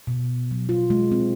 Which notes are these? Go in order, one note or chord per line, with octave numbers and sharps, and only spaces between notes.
B2
F#3
F4
G#3
C4